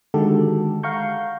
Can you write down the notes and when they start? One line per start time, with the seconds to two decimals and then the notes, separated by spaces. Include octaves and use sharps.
0.14 D3 D#3 G#3 F#4 G4 A4
0.83 F5 F#5 A#5 C#6 G6